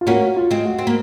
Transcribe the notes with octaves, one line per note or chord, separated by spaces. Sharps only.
F4
A#3 C#4 F#4
F4
G#3 C4
F#4
C4
A#3